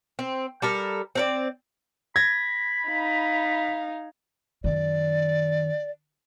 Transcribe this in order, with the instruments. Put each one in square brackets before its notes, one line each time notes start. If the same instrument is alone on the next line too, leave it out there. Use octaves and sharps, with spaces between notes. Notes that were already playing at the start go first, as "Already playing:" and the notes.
[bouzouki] C4
G3 A4 A#4
C4 D4 D5
[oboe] B5 [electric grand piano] G#6 A#6
[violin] D#4 F5
[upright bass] F#2 D#3 [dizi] D5